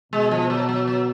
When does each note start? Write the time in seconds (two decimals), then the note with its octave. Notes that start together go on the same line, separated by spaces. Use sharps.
0.13 B2 G#3
0.31 F3
0.50 F#3
0.69 F#3
0.87 F#3